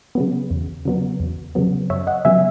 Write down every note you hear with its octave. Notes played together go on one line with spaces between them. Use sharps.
C#3 F#3 B3
E2
C#3 F#3 B3
E2
C#3 F#3 B3
F#2 C#5 E5
D#5 F#5
C#3 F#3 B3 E5 G#5